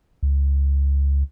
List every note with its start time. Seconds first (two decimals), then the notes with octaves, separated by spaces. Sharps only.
0.23 C#2